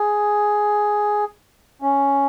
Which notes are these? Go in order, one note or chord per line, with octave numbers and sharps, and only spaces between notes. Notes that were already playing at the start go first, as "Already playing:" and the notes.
Already playing: G#4
C#4